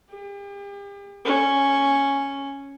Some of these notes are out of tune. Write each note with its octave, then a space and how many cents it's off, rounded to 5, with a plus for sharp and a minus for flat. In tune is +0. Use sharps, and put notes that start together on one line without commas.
G4 +40
C#4 +0